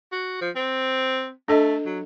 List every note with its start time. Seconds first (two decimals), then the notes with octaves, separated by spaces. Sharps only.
0.12 F#4
0.41 F3
0.56 C4
1.48 A3 D4 A4 D#5
1.86 F#3